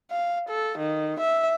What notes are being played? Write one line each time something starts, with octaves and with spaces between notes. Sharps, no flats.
F5
A4
D#3
E5